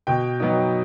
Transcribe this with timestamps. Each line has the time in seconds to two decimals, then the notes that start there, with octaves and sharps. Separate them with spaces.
0.07 B2 G5
0.40 F#3 B3 D#4